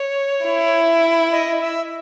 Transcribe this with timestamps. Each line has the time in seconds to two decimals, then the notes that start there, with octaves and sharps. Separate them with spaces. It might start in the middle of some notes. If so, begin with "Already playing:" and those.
Already playing: C#5
0.45 E4
1.32 D#5
1.61 E5